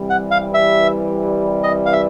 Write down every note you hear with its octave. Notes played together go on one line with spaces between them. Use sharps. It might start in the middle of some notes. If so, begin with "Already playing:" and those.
Already playing: C3 E3 G3
F#5
F5
E5
D#5
F5
E5